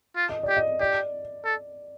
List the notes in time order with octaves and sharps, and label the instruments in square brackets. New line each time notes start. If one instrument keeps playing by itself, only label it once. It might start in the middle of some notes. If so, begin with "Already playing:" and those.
[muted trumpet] F4
[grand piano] D#5
[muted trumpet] G4 [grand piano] D5
[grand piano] D#5
[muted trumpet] G4 [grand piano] D5
[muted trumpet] A4